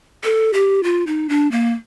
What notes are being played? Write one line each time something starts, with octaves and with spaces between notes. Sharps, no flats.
A4
G4
F4
D#4
D4
A#3